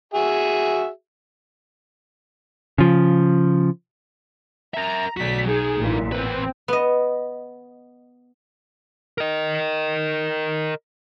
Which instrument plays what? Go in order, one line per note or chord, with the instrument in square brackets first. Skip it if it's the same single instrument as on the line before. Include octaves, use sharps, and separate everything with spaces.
[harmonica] F#4 G#4 E5
[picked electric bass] C#3 F3
[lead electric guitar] A#4 E5 [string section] A#5
[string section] B1 B6 [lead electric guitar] F#4 D5
[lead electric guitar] F#3 D#4 [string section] G#4
[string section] A1 A#2 E3
[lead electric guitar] E2 B4 [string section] C4
[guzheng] B3 D#5
[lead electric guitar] A#4 D#5